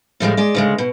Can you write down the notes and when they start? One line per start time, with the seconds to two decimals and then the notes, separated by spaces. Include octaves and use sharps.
0.20 A2 F3 G3 G#3
0.37 G#3 D5
0.55 D2 C#3 G#3
0.78 B2